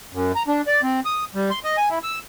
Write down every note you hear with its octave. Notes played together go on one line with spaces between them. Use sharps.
F#2
A#5
D4
D5
C4
D#6
G3
C6
D#5
G#5
E4
E6